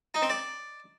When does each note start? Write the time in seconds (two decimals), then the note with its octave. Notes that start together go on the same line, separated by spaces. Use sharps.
0.14 D#4
0.22 C4
0.30 D5